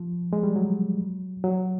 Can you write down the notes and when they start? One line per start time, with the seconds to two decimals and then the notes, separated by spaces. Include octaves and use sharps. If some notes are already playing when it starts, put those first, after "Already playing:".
Already playing: F3
0.33 G#3
0.43 G3
0.56 F#3
1.44 F#3